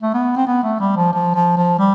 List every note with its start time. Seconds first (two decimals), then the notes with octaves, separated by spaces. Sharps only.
0.02 A3
0.14 B3
0.37 C4
0.47 B3
0.63 A3
0.80 G3
0.96 F3
1.13 F3
1.34 F3
1.57 F3
1.79 G3